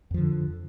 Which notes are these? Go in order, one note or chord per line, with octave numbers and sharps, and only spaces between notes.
F2 D3 F3